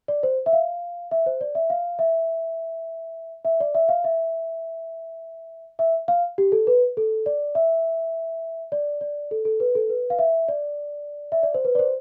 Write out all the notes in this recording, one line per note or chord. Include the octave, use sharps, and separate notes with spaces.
D5
C5
E5
F5
E5
C5
D5
E5
F5
E5
E5
D5
E5
F5
E5
E5
F5
G4
A4
B4
A4
D5
E5
D5
D5
A4
A4
B4
A4
B4
F5
E5
D5
E5
D5
C5
B4
D5
C5